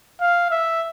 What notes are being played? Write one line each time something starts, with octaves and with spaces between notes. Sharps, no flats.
F5
E5